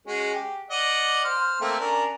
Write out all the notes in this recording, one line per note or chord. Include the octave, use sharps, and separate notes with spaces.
G#3 C#4 F#4
G4
D5 D#5 F#5
C5 F6
A3 A#3 C4
C#4 D4 A#4